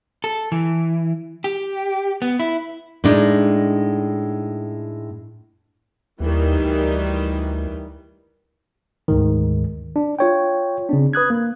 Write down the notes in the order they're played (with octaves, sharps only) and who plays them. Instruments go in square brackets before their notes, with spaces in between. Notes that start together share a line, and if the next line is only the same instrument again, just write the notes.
[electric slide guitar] A4
E3
G4
B3
E4
[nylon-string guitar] A2 G#3 D4 D#4
[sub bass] D#2 [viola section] D#3 E3 G3
[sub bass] D2
[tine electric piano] D2 G#2 D#3
D4
F4 C#5 G5
C#3 C4 D4
B4 D#6 F#6 G#6
A#3